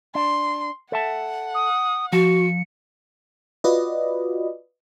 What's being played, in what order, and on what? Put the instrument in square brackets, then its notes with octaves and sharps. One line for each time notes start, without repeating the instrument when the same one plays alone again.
[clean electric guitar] D4 [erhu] C6
[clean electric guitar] A4 E5 A5 [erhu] F#5
[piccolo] D#6
[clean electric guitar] F3 [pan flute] F#4 [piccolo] C#7
[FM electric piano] F4 F#4 B4 D5 D#5